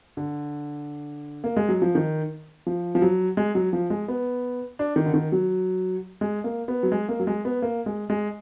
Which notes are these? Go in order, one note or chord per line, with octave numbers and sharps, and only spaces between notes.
D3
A#3
G#3
F#3
F3
D#3
F3
F3
F#3
G#3
F#3
F3
G#3
B3
D4
D#3
D3
D#3
F#3
G#3
A#3
B3
F#3
G#3
A#3
F#3
G#3
B3
A#3
G#3
G#3